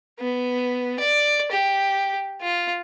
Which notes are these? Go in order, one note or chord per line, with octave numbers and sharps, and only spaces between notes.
B3
D5
G4
F4